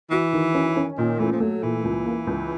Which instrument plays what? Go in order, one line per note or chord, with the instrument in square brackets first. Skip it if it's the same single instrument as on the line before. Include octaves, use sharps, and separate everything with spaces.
[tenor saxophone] E3 [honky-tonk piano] F#4
[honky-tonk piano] D#3
C#4
C#4
[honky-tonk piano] A#2 [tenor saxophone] D#3
[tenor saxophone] E3 [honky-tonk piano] A3
[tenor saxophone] F3
[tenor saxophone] F#3 [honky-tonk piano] A3
[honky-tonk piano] A#2 [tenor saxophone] E3
[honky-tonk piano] C#2
A#3
C#2